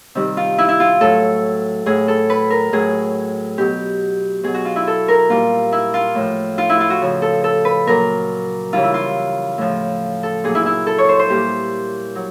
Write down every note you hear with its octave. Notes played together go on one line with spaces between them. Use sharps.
C3 D#3 G3
F4
E4
E4
F4
A2 F#3 A4
A2 F#3 G#4
A4
B4
A#4
A2 F#3 G#4
B2 F#3 G4
B2 F#3 G#4
F#4
F4
E4
A4
A#4
A#2 G3 F4
E4
F4
A2 F3
F4
E4
F4
F#4
C#3 F3
A4
A4
B4
A#2 F#3 A#4
C#3 E3 G3 F4
E4
F4
A2 F3
A4
A#2 F#3 G#4
E4
E4
A4
C#5
C5
C5
A#2 G3 G4
F#3